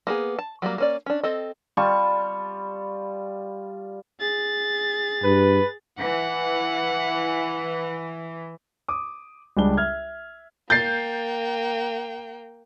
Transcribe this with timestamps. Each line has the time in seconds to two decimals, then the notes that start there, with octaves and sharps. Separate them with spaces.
0.07 A#3 B3 G#4
0.39 A5
0.62 F#3 G3 A3 A#3
0.78 A#3 C#4 D5
1.06 C#4 D4
1.23 C4 A4 D#5
1.77 G3 F4 A5 C#6
4.20 G#4 A6
5.24 G2 B4
6.00 E3 F#5
8.88 D6 D#6
9.57 C#2 G3 G#3 D4 G7
9.77 E5 F6 G#6
10.70 A#3 G5 G6 A6 C7